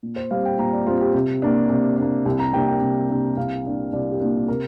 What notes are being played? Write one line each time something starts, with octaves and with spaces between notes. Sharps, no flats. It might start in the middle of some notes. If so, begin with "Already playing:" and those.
A#2
C5
G3 C4 F5
G5
A#2 A#5
D5
G3 C4 F4
G4
C3
A#3 D4
C3
A#3 D4
C2 G4
A#5
C3 A#3 D4 G5
G5
C2
C3 A#3 D4
C2 F5
A#2 A#3 D4
C2 D5
G4
A#2 A#3 D4
C3 A#4